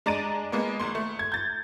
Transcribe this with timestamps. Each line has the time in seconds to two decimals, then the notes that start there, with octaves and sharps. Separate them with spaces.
0.06 G#3 D4 A#5 A6 D7 D#7
0.52 G#3 A#3 B3
0.80 G#1 C6
0.95 A3
1.19 G#6
1.32 G6 A6